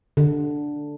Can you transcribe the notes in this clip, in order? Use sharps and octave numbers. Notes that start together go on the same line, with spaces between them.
D3